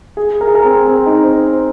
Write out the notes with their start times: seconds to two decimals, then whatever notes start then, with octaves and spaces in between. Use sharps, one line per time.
0.17 G#4
0.41 A#4
0.47 G#4
0.55 A#4
0.65 C4
0.87 C4
1.06 D#4
1.24 C5
1.42 C5